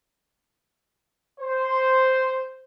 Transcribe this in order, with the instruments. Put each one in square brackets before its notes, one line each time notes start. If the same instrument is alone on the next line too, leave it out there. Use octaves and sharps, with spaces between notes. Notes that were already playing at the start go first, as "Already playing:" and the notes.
[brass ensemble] C5